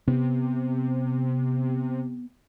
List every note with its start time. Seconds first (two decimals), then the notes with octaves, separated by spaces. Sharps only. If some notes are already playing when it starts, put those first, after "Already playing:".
0.08 C3 B3